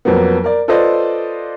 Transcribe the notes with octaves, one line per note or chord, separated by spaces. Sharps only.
F2 F#3 A#3 B3
A#4 D5
F4 A4 B4 C5 D5 D#5